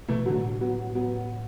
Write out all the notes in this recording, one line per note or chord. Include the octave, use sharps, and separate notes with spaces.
B2 E3 A3
A2 D3 F#3
F#3 B3
F#3 B3